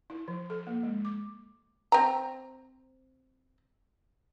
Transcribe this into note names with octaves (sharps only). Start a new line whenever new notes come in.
E4
F3
A4
A#3
G#3
D6
C4 A#5